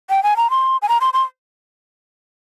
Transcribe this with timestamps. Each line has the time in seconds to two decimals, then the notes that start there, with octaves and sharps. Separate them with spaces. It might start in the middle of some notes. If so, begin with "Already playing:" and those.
0.10 G5
0.23 G#5
0.37 A#5
0.50 C6
0.82 G#5
0.89 A#5
1.01 C6
1.13 C6